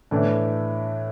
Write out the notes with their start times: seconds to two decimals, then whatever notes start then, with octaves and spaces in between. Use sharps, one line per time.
0.11 A2 E3 A3 D4